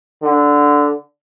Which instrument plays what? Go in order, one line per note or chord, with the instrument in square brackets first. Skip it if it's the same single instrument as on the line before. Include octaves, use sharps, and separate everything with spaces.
[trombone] D3